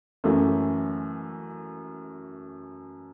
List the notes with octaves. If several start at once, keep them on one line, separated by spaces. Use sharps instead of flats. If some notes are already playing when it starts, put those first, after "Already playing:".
F#2 E3 A3 C#4